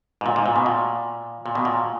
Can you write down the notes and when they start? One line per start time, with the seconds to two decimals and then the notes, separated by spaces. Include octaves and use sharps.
0.21 G#2
0.26 A#2
0.36 G#2
0.46 A#2
0.56 B2
0.66 A#2
1.46 A#2
1.55 B2
1.65 A#2